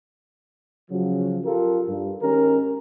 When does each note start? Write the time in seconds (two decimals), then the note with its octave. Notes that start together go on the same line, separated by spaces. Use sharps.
0.91 C#3 F3 F#3
1.45 F4 G4 A4 A#4
1.88 G2
2.22 D#3 G#3 C#4 G4 A#4